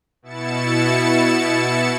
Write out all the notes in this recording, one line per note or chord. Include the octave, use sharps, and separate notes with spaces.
B2 E4 A6 C#7 E7